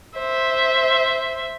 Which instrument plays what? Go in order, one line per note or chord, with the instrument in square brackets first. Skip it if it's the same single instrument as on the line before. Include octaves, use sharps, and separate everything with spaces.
[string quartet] C5 E5